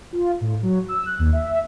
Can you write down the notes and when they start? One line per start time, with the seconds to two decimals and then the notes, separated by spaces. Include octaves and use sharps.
0.13 F4
0.41 A2
0.63 F#3
0.88 E6
1.06 F#6
1.19 D#2
1.32 E5